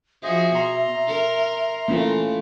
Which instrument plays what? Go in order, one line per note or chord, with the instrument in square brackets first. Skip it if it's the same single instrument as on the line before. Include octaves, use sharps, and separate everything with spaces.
[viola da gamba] F3 F#4 G#4 [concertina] C5 D#5 [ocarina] E5
[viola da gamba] B2 [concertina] A#5 C6
[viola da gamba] A#4
[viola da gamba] E3 A3 [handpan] A#3 C#4 F4